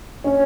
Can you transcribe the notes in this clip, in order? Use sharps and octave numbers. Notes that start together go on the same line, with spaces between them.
C#4 C#5